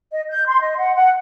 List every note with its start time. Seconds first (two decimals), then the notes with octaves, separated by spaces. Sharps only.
0.12 D#5
0.29 G6
0.46 C6
0.62 D#5
0.77 F#5
0.95 F#5